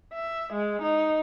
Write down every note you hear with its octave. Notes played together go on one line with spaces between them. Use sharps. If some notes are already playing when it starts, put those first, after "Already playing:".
E5
G#3
D#4